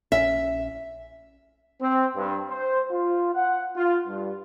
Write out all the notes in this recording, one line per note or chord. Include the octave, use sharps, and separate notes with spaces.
A#1 C#4 E5
C4
G2
C5
F4
F#5
F4
G2